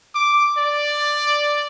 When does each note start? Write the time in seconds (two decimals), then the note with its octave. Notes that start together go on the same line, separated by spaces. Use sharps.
0.15 D6
0.57 D5